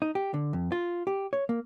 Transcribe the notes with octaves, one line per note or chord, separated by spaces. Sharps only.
D#4
G4
D3
F2
F4
G4
C#5
A#3